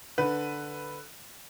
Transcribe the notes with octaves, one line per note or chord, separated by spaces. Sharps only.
D3 B4